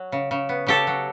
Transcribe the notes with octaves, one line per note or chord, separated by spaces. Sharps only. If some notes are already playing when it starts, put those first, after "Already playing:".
Already playing: F#3
C#3
C#3
B3
C#3 G4 A4
F#3